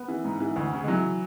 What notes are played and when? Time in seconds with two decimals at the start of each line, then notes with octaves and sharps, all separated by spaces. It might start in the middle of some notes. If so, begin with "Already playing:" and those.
Already playing: B3
0.08 E3
0.24 G#2
0.40 E3
0.56 D2
0.73 C#3
0.84 G#3
0.88 E3 F#3